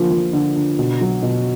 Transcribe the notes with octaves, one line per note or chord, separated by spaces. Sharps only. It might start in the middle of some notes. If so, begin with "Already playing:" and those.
Already playing: D3 F3 A#3
F3
D3
D3
B2
F#3
B2